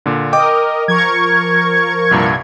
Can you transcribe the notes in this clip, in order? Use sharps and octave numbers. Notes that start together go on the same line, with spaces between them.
A#2 D3
A#4 D#5 G5 D6
F3 A#4 C#6 G#6
C2 G2 A#2